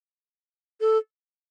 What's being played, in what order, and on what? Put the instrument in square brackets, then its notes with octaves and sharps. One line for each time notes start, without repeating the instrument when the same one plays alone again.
[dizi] A4